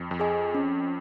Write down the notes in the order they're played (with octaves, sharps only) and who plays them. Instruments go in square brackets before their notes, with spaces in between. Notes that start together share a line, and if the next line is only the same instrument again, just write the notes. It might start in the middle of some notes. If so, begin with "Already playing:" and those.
Already playing: [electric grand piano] F2
F2
[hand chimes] G#4 D#5 G#5
C#4